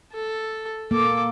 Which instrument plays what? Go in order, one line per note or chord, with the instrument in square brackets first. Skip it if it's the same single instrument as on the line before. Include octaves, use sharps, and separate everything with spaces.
[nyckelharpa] A4
[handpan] A#3 [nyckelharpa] A4 D6